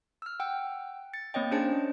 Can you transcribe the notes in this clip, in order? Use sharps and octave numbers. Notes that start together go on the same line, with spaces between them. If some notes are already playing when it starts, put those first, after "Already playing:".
E6 F6
F#5 G5 E6
A6 C#7
A#3 C4 C#5 D#5 G5
C#4 D4 G#4 C5 A5 C#7